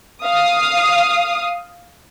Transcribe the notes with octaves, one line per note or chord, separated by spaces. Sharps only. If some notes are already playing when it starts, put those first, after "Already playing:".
F5 D#6